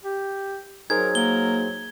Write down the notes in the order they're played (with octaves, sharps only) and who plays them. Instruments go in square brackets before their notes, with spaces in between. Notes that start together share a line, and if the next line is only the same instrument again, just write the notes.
[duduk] G4
[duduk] F#3 [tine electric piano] D#4 G#4 C5 [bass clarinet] A#4 [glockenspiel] G#6
[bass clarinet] A#3 [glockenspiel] G7